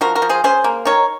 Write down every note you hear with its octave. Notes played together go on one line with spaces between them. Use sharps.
F3 F#4 A#4
F#4 A#4
F3
G#4 C5
C#4 G#4 C5
A#3
D#3 A#4 C#5